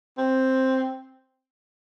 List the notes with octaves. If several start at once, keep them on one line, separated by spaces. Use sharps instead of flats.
C4